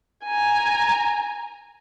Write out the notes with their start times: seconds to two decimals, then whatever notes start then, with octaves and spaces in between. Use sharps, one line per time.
0.25 G#5 A#5